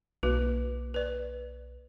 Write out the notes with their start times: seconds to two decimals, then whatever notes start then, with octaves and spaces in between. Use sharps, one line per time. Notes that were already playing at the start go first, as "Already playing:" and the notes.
0.23 B1 A#3 F#4 B4
0.94 B4 D5